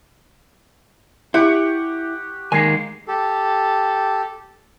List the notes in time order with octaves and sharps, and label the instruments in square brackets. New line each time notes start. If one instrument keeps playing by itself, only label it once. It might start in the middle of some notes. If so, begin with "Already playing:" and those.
[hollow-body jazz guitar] E4 [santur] G4 F#5 C#6
[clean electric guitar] D#3 G#3 A#3 [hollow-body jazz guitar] G#5
[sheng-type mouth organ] G4 A4